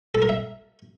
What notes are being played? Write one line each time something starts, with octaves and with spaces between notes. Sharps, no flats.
A4
A#4
E5